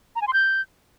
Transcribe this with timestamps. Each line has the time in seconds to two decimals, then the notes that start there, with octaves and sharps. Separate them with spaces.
0.16 A#5
0.22 G#5
0.27 C6
0.33 G6